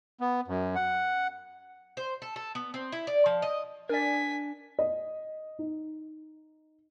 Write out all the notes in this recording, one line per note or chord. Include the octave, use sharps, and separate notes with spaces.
B3
F#2
F#5
C5
A4
A4
B3
C4
E4
D5
F3
D#5
D4 A#4 D5 G#5 B6
D#5
D#4